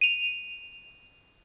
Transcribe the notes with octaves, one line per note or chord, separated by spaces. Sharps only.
D#7 F7